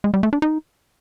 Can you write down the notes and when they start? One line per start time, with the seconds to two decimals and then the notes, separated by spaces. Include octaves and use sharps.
0.04 G#3
0.14 G3
0.23 A3
0.33 D4
0.42 D#4